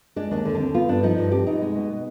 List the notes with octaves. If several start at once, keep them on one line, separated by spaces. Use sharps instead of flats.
G#3 D4
D#2 D4
D3
D4
C4
B3 F4
G2 D4
F3 D#4
G2
C4 G4
B2 D#4
G#3
B2
B3